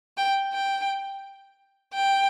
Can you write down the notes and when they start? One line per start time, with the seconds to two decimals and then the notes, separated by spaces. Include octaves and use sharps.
0.17 G5
0.53 G5
1.95 G5